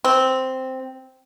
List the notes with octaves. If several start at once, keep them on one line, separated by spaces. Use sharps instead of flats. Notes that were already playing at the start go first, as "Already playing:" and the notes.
C4